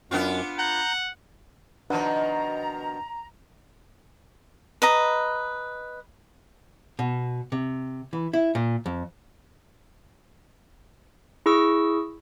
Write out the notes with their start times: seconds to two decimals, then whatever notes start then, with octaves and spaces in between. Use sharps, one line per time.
0.11 F#2 B3 D4 F4
0.59 F#5 A#5 G6
1.90 B2 D#3 F3 D4 B4 F#5 A#5
4.82 B4 D#5 A#5
6.99 B2
7.52 C3
8.13 E3
8.33 E4
8.55 A#2
8.86 F2
11.46 E4 G#4 C#6 E6